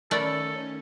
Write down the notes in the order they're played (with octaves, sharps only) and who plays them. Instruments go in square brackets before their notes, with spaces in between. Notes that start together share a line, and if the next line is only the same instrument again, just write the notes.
[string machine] D#3 C#4 [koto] A3 [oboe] A4 [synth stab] A#4 D5 B5